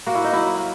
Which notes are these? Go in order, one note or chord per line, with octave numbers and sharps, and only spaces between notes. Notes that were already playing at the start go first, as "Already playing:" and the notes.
A#3 F#4
E4
D#4
F#3 E4
A#3